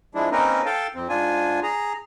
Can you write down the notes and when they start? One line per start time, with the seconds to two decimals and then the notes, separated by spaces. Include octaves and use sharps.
0.15 F3 G#3 D4 E4
0.32 A#3 C4 C#4 D#4 A#4 B4
0.66 A4 F5 G5 A5
0.95 F2 C4
1.09 G#2 D4 F4 G#5
1.63 G#4 A#5